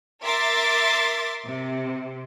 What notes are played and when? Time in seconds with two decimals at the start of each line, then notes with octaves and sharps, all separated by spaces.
0.23 A#4 E5 C6 D6 A6
1.46 C3